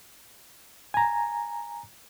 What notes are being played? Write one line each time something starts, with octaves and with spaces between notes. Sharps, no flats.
G#5 A#5